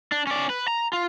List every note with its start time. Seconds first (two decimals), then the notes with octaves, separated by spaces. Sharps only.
0.12 D4
0.27 C#4 D5
0.50 B4
0.68 A#5
0.93 F4